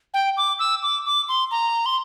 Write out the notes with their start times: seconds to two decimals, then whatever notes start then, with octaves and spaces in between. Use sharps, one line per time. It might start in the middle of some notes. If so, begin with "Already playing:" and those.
0.14 G5
0.37 D6
0.59 E6
0.82 D6
1.06 D6
1.29 C6
1.51 A#5
1.86 C6